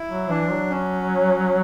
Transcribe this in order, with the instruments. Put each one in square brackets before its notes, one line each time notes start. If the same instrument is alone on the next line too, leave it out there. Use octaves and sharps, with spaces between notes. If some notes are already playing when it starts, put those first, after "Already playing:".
Already playing: [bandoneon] E4
[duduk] F#3
[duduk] E3 [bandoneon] D4
[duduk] F#3
[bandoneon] C#4